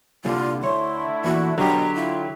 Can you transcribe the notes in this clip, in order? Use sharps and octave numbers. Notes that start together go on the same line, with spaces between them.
C2 A#2 D3 G3 F4
D2 D3 A3 E4 C#5 C6
E2 A#2 E3 F#4
B2 D3 F#3 G4 A#5
E4 F4